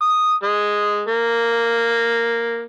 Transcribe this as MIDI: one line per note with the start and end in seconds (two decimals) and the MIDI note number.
0.01 0.33 87
0.43 1.02 56
1.08 2.64 58